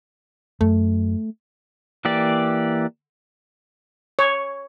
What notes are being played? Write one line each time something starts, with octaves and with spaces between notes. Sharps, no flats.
F#2 F#3 A3
E3 A#3 G4 D5
C#5